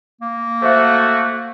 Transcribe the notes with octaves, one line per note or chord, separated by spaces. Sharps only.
A#3
A3 F#4 C5 E5 F5